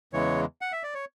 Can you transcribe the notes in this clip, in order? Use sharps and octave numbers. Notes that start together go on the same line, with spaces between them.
E2 C#3 E3 G#3 C#5
F#5
E5
D5
C#5